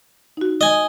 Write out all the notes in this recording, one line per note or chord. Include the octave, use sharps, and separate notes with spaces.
D#4 F#4
D#5 G#5